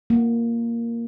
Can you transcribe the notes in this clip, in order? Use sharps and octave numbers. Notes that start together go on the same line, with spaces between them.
A#3